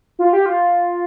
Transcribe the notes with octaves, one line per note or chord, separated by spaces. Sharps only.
F4
G4
F4